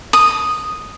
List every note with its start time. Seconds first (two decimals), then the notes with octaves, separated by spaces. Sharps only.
0.13 D#6